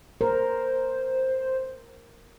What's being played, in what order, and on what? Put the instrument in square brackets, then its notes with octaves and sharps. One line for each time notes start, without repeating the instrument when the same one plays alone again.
[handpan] A#4 [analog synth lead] C5